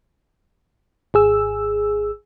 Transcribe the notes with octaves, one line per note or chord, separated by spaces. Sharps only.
G#1 G#4 E6